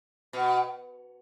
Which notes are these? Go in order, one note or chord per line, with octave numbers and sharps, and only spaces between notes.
B2